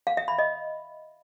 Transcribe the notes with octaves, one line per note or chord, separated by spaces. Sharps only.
F5
E5
B5
D#5